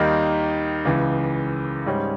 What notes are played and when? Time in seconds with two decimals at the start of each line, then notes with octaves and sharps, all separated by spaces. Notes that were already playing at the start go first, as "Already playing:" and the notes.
Already playing: D#2 D#3 G3 A#3 D#4
0.85 C#2 C#3 E3
1.86 G#2 G3 C#4